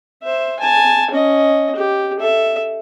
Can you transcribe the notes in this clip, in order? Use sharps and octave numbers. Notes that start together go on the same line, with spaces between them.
C5 E5
G#5 A5
C#4 D#5
G4
A4 E5